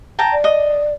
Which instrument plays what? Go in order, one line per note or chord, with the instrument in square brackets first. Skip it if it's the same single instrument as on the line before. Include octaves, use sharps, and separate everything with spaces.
[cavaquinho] G5 A5 A#5
[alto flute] D5
[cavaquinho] D#5